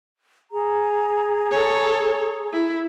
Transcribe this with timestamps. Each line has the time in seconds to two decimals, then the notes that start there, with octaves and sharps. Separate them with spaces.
0.52 G#4 A#5
1.51 A4 C#5
2.53 E4